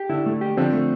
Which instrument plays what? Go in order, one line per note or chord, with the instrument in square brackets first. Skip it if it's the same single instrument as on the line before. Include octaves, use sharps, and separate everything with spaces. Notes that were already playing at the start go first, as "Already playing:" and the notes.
Already playing: [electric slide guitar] G4
[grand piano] D3 [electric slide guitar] E4
[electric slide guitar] A3
G4
[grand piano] D3 F3 [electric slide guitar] C4
[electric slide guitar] A3